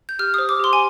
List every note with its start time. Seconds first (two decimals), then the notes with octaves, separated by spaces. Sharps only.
0.09 G6
0.19 G4 F6
0.34 C5 D#6
0.49 D6
0.60 G4 C6
0.73 G#5